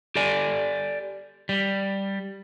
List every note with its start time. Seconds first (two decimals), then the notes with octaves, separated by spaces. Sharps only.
0.16 G4 A4 D5 G#5
1.49 G3